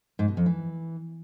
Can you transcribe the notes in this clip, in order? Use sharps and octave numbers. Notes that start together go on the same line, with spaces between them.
G#2
B2
F2
E3